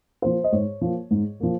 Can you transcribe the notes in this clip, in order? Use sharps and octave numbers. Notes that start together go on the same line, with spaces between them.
F3 A#3 C5
D#5
G#2 C#5
F3 A#3
G#2
F3 A#3